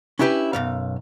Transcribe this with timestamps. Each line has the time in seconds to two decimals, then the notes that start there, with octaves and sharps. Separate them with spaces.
0.19 C#4 D4 E4 G4 B4
0.53 B1 F#2 F5